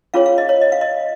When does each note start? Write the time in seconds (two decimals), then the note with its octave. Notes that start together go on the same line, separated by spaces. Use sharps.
0.14 C#4 F4 G#4 C#5 F5
0.26 F5
0.38 D#5
0.49 C#5
0.62 D#5
0.72 F5
0.81 D#5